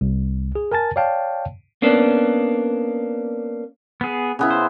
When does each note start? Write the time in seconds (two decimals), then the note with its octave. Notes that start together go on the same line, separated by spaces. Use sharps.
0.01 C2
0.55 G#4
0.72 A#4 G#5 A5 A6
0.96 C#5 D5 F5 G5 A5
1.82 A#3 B3 C#4 D4
4.01 B3 G#4
4.39 C#3 B3 E4
4.51 C5